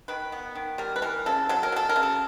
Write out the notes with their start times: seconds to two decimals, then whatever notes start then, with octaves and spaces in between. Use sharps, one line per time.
0.08 D#3 B4
0.32 B3
0.55 D#3
0.78 G3 A#4
0.96 B4
1.02 E3 A#4
1.26 C#3 A4
1.49 F#3 A4
1.63 A#4
1.72 F#3 A4
1.89 A#4
1.96 C#3
2.03 A4